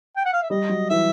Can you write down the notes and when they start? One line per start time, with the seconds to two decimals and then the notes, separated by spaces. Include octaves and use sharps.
0.17 G5
0.26 F#5
0.33 F5
0.42 E5
0.50 G3 D#5
0.69 F#3
0.90 E3 E5